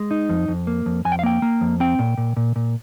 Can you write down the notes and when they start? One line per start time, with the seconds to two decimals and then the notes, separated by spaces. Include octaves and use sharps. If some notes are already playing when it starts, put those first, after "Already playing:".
Already playing: G#3
0.11 D#4
0.29 F2
0.48 F2
0.67 A#3
0.86 F2
1.05 F2 G#5
1.12 G5
1.19 F5
1.23 A#3 G5
1.42 A#3
1.61 F2
1.80 C4 G5
1.99 A#2
2.18 A#2
2.37 A#2
2.56 A#2